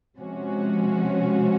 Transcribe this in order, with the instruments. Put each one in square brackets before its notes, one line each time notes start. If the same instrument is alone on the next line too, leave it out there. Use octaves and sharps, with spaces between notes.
[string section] C3 F3 G#3 C#4 F#4